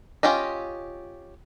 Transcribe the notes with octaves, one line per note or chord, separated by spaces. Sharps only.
C#4 F4 G4 D#5